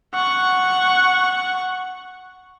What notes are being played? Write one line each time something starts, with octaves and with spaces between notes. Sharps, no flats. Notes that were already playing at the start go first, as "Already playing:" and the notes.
F#5 C#6